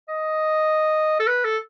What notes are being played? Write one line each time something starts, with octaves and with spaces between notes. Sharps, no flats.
D#5
A4
B4
A4